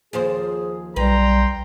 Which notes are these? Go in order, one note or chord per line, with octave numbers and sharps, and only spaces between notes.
D#2 F3 G#4 C5
B1 G3 B4 G5 A#5 C6